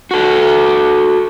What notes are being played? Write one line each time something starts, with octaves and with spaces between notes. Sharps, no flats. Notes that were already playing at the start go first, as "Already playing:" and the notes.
F#4 A4